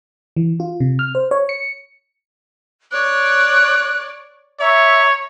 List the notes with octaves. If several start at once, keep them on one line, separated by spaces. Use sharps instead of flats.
E3
F4
C3
F6
C5
C#5
C#7
C#5 D5 F#6
C#5 E5 A#5